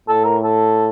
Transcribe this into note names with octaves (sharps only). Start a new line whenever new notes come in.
A2 A4
A#4
A4